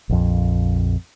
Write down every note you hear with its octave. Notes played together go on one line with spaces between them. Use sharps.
A#1 F2